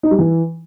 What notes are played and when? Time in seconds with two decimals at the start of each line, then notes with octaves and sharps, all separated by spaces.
0.03 D#4
0.11 G3
0.18 E3